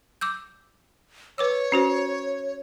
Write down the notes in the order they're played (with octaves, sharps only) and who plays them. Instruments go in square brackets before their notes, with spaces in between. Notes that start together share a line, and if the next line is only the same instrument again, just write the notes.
[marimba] D6 E6 G6
[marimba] B4 D6 E6 [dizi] C#5
[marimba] C#4 F#4 C5